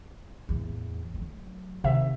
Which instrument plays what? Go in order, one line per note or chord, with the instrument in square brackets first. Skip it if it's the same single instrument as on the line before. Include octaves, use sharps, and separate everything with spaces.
[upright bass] E2 A2
F#3 A3
[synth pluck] C3 E5 [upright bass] D#3